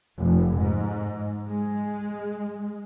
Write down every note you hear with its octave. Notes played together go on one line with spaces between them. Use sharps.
F1
G#2
G#3